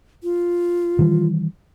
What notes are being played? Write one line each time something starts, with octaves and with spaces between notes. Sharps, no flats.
F4
D#3 E3 G3